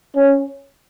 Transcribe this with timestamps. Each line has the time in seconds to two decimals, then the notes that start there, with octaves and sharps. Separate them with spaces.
0.16 C#4